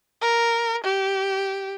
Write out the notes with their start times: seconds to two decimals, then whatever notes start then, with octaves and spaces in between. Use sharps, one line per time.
0.22 A#4
0.84 G4